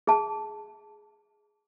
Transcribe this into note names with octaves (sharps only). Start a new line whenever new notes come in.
G#4 A5